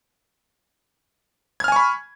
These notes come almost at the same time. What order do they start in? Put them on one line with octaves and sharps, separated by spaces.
G#6 F6 G#5 C#6 B5